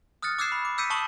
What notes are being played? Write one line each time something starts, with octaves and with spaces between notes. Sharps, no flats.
D#6 F6 F#6 A6 C#7
D6 E6 F#6 G#6 C7 E7
B5
D6
D6 E6 G6 B6 C#7 D#7
A5 C#6 D#6 E7 F#7